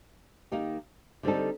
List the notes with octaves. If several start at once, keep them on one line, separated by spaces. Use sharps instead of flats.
D#3 A#3 D#4 G4
D3 G3 C4 D#4 A4